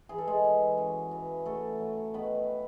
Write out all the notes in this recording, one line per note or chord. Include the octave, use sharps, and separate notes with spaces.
E3 G#4
A4
G#3 G#4
E3
F#2
E3
F#3 A3 A4
F#3
D#3 B3 B4